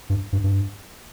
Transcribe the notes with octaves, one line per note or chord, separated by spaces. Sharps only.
G2
G2
G2